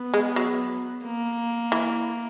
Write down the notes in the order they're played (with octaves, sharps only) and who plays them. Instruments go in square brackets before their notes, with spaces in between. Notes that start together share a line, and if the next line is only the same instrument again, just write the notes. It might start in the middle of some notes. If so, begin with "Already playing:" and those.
Already playing: [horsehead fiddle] B3
[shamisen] G#3
F#3
[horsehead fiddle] A#3
[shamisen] E3